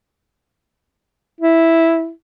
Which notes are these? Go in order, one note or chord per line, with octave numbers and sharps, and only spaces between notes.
E4